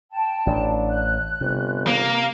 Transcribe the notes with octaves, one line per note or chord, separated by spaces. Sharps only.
G5 A5
A1 D4
F#6
G1 C3
A#3